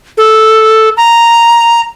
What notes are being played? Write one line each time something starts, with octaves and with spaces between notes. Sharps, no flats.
A4
A#5